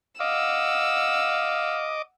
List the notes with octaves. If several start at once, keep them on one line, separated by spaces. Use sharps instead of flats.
D#5 F5 F#5 D6 E6